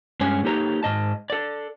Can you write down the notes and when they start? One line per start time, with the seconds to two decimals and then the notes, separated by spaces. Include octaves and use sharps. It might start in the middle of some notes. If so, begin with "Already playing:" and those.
0.21 G2 G#3 C#4 C#5 G#5
0.44 A#3 D#4 G4 A4 C#5 A#5
0.83 G#2 D#5 A5
1.30 A4 D5